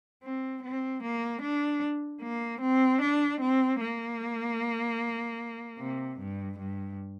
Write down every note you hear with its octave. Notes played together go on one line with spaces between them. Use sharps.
C4
C4
A#3
D4
A#3
C4
D4
C4
A#3
C3
G2
G2